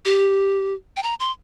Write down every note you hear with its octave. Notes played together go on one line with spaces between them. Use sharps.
G4
G5
A#5
C6